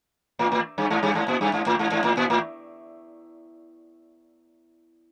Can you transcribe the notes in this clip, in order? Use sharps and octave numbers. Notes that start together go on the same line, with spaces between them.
A2
A2
G2
G#2
G2
G#2
A#2
G2
G#2
A2
G#2
G#2
A2
A#2
A2